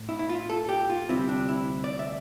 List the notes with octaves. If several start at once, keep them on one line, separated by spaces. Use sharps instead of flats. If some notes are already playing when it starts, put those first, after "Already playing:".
Already playing: A2
E4
E4
F4
A4
G4
F4
D2 C3 G3 C4 E4
D4
E4
D5
E5